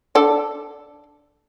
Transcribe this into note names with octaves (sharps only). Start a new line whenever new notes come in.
D4 A4 D5